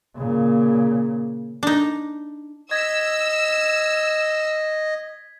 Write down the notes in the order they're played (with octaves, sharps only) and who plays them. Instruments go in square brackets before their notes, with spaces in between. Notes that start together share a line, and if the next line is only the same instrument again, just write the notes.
[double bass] A#2 C#3
[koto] D4 D#4
[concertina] D#5 [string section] E6 [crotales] G#6 B6